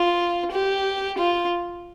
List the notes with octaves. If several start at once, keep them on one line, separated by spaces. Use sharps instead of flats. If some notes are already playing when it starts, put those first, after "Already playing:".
Already playing: F4
G4
F4